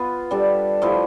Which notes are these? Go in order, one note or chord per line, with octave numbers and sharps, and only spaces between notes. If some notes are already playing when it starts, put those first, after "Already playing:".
Already playing: B3 F4 B4
G3 D4 A4
F3 A3 E4 G4